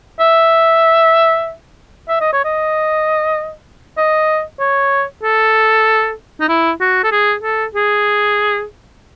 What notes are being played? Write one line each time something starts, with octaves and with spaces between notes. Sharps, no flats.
E5
E5
D#5
C#5
D#5
D#5
C#5
A4
D#4
E4
F#4
A4
G#4
A4
G#4